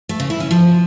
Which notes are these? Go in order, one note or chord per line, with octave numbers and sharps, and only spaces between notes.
A3
C#3
E4
C#4
F3